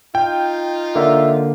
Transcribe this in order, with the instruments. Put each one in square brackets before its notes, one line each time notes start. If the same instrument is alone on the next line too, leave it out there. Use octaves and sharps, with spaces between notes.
[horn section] D#4 F4 [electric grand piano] G5
[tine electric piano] D3 A#3 [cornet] E5